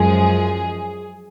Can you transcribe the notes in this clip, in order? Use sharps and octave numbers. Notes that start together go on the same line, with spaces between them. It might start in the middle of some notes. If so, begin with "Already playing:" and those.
Already playing: F#2 F3 G#3 G#4